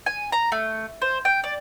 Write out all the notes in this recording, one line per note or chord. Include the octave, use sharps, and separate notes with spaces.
G#5
A#5
A3
C5
G5
D5